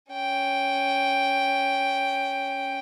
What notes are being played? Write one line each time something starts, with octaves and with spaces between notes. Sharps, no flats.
C#4 G5